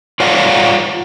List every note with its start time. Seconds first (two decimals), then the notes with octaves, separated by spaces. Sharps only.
0.20 F4 C#5 D5 F5 F#5